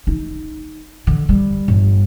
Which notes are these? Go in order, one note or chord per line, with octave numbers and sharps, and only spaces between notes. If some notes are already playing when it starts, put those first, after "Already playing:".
D#4
D3
G3
G1